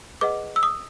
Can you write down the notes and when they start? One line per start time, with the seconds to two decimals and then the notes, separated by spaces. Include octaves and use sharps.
0.21 G#4 B4 D#5 F#5 D6
0.56 E6
0.63 D#6